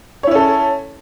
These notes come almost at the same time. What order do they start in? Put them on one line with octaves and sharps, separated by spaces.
C#5 E4 C#4 A4